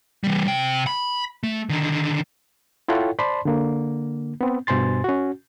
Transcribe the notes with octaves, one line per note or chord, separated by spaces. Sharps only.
E3 G3
C3 G5
B5
A3
D3 D#3
E4 F4 A4 C#5 F#5 G5
C5 D5 A5 B5 C6
D3 A#3
B3 C4
G2 B2 C5 G#5 C6 A6
C#4 F#4